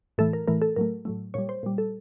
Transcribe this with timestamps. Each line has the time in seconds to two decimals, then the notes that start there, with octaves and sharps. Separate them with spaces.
0.18 A2 E3 A3 A4
0.33 A#4
0.48 A2 E3 A3 A#4
0.62 A4
0.76 A2 F#3 A3 A#4
1.05 A2 F#3 A3
1.34 A#2 G3 C#5
1.49 C5
1.63 A#2 G3
1.78 A4